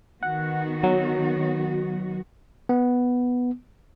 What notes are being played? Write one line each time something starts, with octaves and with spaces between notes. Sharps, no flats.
D#3 B3 F#4 F#5
F#3
B3